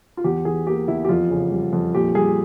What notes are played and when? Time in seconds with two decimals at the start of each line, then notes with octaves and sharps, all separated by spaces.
0.17 F4
0.24 E2 G4
0.45 E3 G#4
0.67 A#3 G4
0.88 E2 E4
1.05 G4
1.09 F2 F4
1.30 C#3
1.52 G3
1.73 F2
1.95 A#2 G4
2.15 G3 G#4